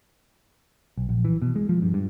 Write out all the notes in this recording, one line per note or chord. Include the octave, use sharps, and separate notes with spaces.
B1
A#1
E3
B2
G#3
F3
G2
G2